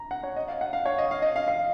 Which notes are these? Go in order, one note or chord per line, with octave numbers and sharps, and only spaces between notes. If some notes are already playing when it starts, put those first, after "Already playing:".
Already playing: A#5
F#5
C#5
D#5
F5
F#5
F5
C#5
D#5
F5
D#5
F5
F5